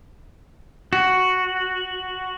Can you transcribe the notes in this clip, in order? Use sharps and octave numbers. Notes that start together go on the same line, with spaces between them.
F#4